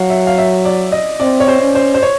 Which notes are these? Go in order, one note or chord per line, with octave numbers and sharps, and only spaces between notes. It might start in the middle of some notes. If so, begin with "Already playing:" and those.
Already playing: F#3 F5 F#5
E5
F5
E5
D5
D#5
C4 D5
C#5
C5
C#4
C5
C5
C#5